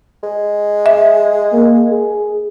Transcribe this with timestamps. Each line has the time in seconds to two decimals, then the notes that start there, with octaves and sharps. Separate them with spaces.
0.23 G#3
0.86 E5
1.52 A#3
1.90 G#4